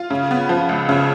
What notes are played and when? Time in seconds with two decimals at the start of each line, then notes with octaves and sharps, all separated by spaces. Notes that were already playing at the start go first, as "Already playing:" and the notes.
Already playing: F4
0.10 C#3
0.31 B3
0.49 F3
0.69 C#2
0.89 C#3